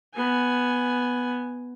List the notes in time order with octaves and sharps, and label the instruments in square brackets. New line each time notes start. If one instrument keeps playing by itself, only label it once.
[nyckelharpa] B3 G#5